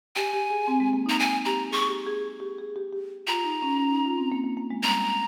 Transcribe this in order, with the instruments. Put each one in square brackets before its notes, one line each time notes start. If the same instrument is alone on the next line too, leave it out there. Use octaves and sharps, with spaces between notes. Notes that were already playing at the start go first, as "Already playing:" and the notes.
[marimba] G4 [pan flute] G#5
[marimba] G4
G#4
C4
G#3
A#3
D#4
[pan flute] A#5
G#5
[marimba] G4 [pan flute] A#5
[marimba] G#4 [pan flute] C#6
[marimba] G4
G#4
G4
G#4
G4
G4
[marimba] F4 [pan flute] A#5
[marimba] D#4
C#4
C#4
D#4
F4
C4
A#3
A#3
A#3
G#3
[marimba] G3 [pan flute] A#5
[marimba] G#3